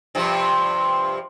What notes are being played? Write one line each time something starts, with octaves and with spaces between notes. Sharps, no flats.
G2 C3 F3